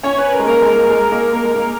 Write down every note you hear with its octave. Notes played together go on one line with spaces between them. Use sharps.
C#4 C#5
B4
A#4
G#3
A#3 A#4
G#3
A#3
G#3
A#3
A#3 A#4
G#3
A#3